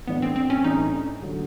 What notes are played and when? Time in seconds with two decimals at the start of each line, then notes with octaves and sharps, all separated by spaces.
0.07 A2 E3 A3 B3 D4
0.22 C4
0.36 C4
0.50 C#4
0.64 A2 E3 A3 D4 D#4
1.22 D3 F#3 A3